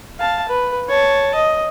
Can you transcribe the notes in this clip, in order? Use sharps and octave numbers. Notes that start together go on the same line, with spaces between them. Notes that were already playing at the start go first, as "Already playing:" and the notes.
F5 A5
B4
C#5 A5
D#5